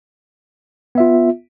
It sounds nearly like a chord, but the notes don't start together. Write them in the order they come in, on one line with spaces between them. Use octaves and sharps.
B3 E5 F4